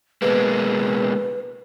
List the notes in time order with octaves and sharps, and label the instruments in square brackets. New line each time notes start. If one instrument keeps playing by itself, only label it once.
[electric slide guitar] B2 G#3 A#3 [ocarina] B4